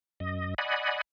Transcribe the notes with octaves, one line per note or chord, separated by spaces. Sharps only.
F#2 D#5
D5 D#5 F#5 G#5 B5